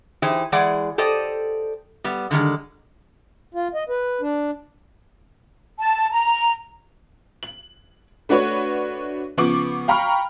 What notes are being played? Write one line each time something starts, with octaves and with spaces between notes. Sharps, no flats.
E3 D#4 G4 G#4 C5
E3 G#3 G#4 D5 F#5
G4 A4 C5 D5 D#5
G3 B3
D3 D#3 G3 G#3
F4
D#5
B4
D4
A5
A#5
F#7
A3 D4 F#4 B4 C#5 C#6
C#3 F3 B3 C#6 D6 F#7
F5 G5 A#5 B5 C#6 F6